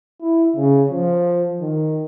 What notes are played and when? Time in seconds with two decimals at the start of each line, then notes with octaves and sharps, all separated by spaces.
0.21 E4
0.56 C#3
0.90 F3
1.61 D#3